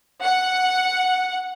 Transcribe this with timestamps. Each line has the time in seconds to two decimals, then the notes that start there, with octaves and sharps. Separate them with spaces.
0.23 F#5